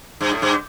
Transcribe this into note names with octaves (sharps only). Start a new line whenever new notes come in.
G2
A2
G2